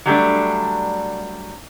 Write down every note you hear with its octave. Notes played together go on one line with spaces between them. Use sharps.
F#3 G3 A3 D4